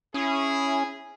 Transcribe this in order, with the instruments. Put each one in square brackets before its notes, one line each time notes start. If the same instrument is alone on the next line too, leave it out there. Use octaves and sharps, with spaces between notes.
[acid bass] C#4 [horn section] E4 G#4